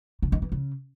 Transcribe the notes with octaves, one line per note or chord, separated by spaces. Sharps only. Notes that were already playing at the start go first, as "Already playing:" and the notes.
C#3
D#3
E3
C#3